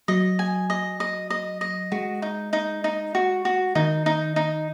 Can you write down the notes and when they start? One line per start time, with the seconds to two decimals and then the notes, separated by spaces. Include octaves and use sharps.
0.08 F#3 D#5
0.39 G#5
0.70 D#5
1.00 D#5
1.30 D#5
1.61 D#5
1.92 G#3 F#4
2.22 D#4
2.53 D#4
2.84 D#4
3.15 F#4
3.45 F#4
3.75 D#3 D#4
4.06 D#4
4.36 D#4